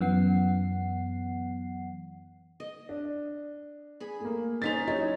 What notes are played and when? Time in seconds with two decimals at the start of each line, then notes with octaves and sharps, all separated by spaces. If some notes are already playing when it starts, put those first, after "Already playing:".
0.01 F#2 E3 B3 F#5 C7
2.60 D#5
2.89 D4
4.00 G#4 B5
4.21 A3 A#3
4.62 C#4 D#4 C5 A6 B6 F7
4.88 F#3 D#4 E4 C#5